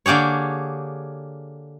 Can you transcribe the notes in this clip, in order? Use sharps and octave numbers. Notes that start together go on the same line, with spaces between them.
D3 A#3 G4 G#4 C#5